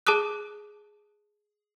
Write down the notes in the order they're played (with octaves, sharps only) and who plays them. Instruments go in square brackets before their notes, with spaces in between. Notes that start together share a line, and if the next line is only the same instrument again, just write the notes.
[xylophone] G#4 A5 D6 D#6 F#6